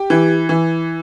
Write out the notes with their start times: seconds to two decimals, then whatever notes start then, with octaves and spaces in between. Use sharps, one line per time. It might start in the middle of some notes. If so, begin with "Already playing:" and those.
Already playing: G4
0.10 E3
0.49 E3